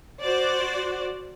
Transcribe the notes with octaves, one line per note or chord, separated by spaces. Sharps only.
F#4 C5 D5